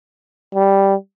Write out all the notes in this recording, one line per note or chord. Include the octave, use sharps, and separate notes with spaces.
G3